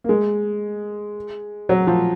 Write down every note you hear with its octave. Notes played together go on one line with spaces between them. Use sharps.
A#3
G#3
F#3
F3